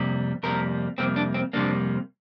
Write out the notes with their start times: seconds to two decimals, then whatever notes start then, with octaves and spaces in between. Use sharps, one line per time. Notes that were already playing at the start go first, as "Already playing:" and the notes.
Already playing: F2 C3 G3 A#3
0.43 F2 C3 G3 A#3 A#4
0.98 F2 C3 G3 A#3 C4
1.16 D4
1.34 C4
1.53 F2 C3 G3 A#3 D4